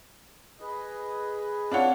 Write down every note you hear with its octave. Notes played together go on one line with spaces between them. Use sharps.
G#4 B4 D#5
C4 D4 F4 C#5 F#5